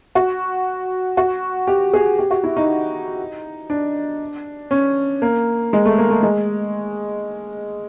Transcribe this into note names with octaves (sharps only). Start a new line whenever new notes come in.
F#4
F#4
G4
G#4
G4
F#4
E4
D#4
D4
C#4
A#3
G#3
A3
A#3
A3
G#3